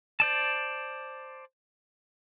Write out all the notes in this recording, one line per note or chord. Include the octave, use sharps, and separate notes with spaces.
C5 D5 A5